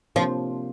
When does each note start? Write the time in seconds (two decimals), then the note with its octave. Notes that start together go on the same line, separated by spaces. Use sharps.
0.16 C3 F3 A#3 D4 F4